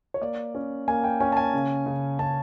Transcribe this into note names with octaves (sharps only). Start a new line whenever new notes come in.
C#5
A#3 D5
C#4
A#3 G#5
G5
C#4 G#5
A5
G#5
C#3
C#3
C#3 A5